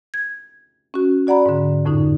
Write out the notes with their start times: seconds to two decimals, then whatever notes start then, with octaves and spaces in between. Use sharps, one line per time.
0.14 G#6
0.94 C#4 F#4
1.27 F#4 D5 F#5 A#5 B5
1.46 G#2 D3
1.85 F2 A2 D3 D#4